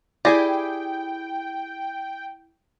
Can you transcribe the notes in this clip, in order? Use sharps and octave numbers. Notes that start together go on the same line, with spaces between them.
E4 G4 G#4 D5 G5 G#5 A#6